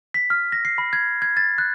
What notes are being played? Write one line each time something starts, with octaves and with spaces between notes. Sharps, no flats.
B6
F6
A#6
C7
B5
G#6
G#6
A6
F#6